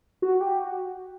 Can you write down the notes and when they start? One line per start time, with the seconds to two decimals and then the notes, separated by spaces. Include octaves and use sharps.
0.22 F#4
0.41 G4
0.59 F#4